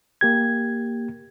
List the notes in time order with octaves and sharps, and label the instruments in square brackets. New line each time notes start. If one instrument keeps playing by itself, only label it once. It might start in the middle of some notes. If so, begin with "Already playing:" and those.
[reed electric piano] A#3 G4 G#6